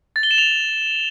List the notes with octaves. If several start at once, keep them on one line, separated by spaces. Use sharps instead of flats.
A6
G7
E7
F7